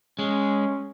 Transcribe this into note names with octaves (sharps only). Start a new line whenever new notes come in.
G#3 C#4